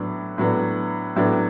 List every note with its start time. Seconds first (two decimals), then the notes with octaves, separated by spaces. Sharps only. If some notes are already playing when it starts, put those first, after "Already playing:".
Already playing: A2 F#3 B3 D4
0.38 A2 F#3 B3 D4
1.16 A2 F#3 B3 D4